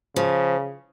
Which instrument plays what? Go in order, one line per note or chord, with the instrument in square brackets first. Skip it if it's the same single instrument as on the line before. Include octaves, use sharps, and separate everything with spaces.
[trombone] C#3 [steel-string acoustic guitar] F3